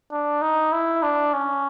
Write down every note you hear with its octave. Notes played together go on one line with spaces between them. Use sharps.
D4
D#4
E4
D4
C#4